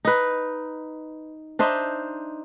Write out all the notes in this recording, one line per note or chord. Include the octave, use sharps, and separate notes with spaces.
D#4 B4
D4 D#4 C5 E5